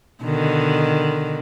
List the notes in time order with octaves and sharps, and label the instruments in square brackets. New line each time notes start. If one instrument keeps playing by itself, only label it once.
[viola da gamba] B2 D3 D#3